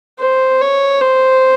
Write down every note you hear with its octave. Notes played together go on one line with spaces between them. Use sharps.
C5
C#5
C5